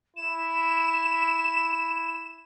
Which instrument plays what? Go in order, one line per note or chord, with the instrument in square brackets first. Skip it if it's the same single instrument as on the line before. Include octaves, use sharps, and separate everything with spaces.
[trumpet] E4 [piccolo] E7